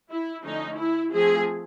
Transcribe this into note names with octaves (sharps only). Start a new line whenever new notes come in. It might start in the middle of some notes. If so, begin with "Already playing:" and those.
E4
D3 F3 A3 C#4 D#4
E4
F3 A3 C4 G#4